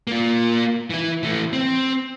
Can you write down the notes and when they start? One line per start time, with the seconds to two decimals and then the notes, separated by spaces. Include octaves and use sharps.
0.07 A#3 F4
0.90 E3 E4
1.23 E3 A3
1.53 C4